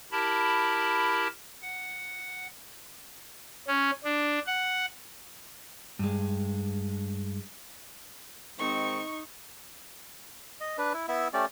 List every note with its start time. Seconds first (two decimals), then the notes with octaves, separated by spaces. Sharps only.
0.12 E4 G4 A#4 A5 B5
1.62 F#5
3.68 C#4
4.04 D4
4.47 F#5
5.99 G2 G#3
8.59 D#3 G#3 C4 D#4 C#6
10.61 D#5
10.78 D4 B4
10.94 E4
11.08 B3 E4 E5
11.33 A3 C#4 G4 D5